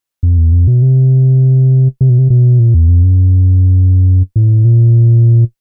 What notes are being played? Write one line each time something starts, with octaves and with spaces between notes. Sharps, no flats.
F2
E2
F2
B2
C3
C3
B2
C3
B2
A#2
E2
F2
F#2
A2
A#2